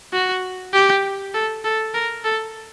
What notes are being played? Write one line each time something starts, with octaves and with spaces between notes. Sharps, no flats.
F#4
G4
A4
A4
A#4
A4